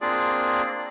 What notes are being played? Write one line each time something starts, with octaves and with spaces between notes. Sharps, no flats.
A#3 C4 D4 F4 G#4 D5